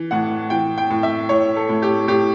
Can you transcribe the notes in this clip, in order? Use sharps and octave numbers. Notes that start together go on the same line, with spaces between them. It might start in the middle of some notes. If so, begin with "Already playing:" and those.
Already playing: E3
A2 F#5
E3 G5
G5
A2
E5
A2 C#5
A4
A2
G4
A2 G4